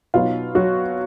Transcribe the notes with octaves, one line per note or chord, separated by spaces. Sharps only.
B2 F#3 B3 D#4 F4
F#3 F#4